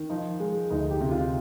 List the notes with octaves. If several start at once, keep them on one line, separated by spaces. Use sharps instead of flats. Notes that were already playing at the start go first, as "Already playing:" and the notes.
Already playing: D#3
F3 D#4
G#3
D2 D#4
G4
C3
F4